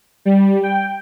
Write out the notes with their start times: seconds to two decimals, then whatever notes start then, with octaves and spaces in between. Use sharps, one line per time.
0.25 G3
0.63 G5